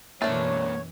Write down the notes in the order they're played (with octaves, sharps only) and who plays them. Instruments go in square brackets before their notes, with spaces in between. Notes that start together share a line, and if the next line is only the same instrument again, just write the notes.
[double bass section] F#2 B2 E3 [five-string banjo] A3 D4 [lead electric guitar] A#3 C4 [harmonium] C#5